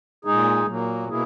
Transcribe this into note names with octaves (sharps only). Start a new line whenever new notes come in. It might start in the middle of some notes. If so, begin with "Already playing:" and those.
A#2 G#3 D#4 G#4
A#2 F#3 A#3
B2 A#3 E4 G#4